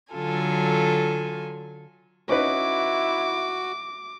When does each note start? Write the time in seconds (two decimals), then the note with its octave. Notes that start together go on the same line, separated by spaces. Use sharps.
0.12 D3 F#3 F4 A4 G#5
2.29 C#4 D#4 E4 F#4 B4 D6